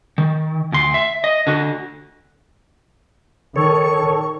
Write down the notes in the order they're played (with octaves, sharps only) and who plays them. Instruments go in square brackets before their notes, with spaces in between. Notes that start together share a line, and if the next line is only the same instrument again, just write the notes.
[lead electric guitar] D#3
D2 C6
E5
D#5
D3 F#4
[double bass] D#3 [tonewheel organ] A4 C#5 [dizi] C#6